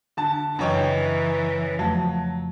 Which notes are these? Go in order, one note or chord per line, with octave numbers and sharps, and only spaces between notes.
D3 A5
F#2 C#3 E3 C#5 D#5 G5 G#6
F2 F3 F#3 A3